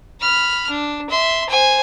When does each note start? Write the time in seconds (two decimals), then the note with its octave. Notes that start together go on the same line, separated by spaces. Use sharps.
0.21 B5 F6
0.70 D4
1.10 E5 C6
1.49 C5 G#5